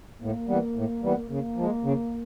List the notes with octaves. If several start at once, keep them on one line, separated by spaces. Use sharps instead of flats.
A2 A#3
E3 G3 B3
A2
E3 G3 B3
C#3 A#3
F3 G#3
C#3